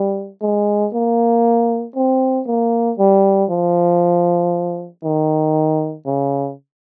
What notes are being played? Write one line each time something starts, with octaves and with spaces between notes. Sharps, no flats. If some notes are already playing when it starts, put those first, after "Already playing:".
Already playing: G3
G#3
A#3
C4
A#3
G3
F3
D#3
C#3